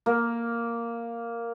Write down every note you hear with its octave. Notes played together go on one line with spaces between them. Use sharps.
A#3